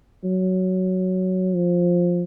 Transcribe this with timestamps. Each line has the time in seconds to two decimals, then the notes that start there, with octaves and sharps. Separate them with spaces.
0.24 F#3
1.55 F3